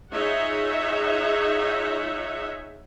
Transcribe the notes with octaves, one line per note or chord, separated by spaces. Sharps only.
D#4 F4 G#4 C#5 E5 F#5